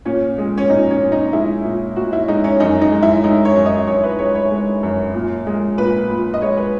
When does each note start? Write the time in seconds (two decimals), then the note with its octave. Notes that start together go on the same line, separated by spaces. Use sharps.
0.05 A#2 C#4
0.38 G#3
0.58 C#4
0.70 A#2 D#4
0.91 C#4
1.01 A#2
1.12 D#4
1.33 G#3 E4
1.65 A#2
1.96 A#2 F#4
2.13 E4
2.28 G#3 D#4
2.44 C#4
2.60 F#2 D#4
2.81 D#4
2.92 G#3
3.03 E4
3.24 G#3 D#4
3.45 C#5
3.55 F#2
3.66 D#5
3.87 F#2 C#5
4.03 B4
4.19 G#3 C#5
4.35 C#5
4.51 G#3
4.83 F#2
5.14 A#2
5.47 G#3
5.78 A#2 B4
6.10 A#2
6.34 D#5
6.42 G#3 C#5
6.57 B4